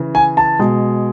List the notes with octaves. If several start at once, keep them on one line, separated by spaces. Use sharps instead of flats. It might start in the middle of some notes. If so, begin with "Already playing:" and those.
Already playing: C#3 E3
G#5
A5
B2 G#3